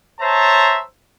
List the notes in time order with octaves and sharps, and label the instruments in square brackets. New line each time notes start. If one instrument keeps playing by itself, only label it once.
[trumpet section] C5 C#5 E5 A5 A#5